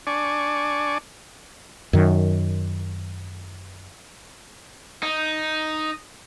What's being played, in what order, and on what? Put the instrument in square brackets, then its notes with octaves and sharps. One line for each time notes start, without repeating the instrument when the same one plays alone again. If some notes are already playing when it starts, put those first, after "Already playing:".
[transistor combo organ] D4 D5 G#5 C#6
[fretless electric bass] F#2 D#3
[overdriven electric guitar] D#4